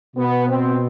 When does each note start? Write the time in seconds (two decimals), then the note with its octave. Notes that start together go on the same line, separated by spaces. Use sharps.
0.16 B2 B3
0.48 C4